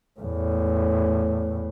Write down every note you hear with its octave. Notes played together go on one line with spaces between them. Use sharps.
E2 A2